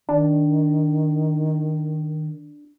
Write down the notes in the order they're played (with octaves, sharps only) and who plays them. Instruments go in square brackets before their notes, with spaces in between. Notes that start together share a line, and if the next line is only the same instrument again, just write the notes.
[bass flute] D#3 [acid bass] D4